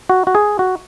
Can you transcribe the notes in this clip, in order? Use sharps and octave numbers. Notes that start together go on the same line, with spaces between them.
F#4
F#4
G#4
F#4